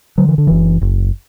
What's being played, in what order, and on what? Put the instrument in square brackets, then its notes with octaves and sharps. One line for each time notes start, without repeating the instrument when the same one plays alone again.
[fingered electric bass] D3 F#3
E3
D3
F#1 E3
F#1